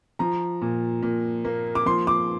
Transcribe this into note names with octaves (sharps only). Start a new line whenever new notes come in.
F3 A#5
A#2
A#2
A#3
D6
F3 C6
D6